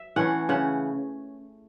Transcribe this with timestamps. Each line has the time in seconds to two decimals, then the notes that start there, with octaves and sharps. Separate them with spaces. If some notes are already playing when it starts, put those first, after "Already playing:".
Already playing: E5
0.16 E3 A3 C#4 F#5
0.49 C#3 F#5